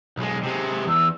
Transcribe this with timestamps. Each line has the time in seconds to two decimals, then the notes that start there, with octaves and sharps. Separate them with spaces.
0.17 B1 G#3
0.43 C3 G#3
0.87 E2 E6